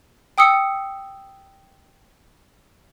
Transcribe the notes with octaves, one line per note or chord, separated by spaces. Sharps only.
G5 D#6 E6 C#7